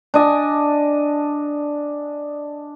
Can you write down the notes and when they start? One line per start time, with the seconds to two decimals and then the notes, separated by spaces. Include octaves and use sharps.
0.14 D4 D#5 G#5